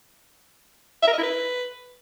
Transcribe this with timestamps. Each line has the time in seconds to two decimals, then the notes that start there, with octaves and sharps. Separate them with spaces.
1.02 E5
1.08 A#4
1.13 D#5
1.18 E4
1.23 B4